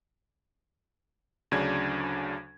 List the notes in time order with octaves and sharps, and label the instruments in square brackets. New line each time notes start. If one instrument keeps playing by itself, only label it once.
[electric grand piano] D2 C#3 F#3 D4 G#6